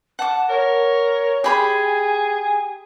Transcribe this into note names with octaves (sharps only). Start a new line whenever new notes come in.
F#5 A5 D6
A#4 C#5
G4 G#4 G#5 B5 C6